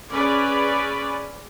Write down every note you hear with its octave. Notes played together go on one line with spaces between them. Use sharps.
C#4 G#4 B4 D5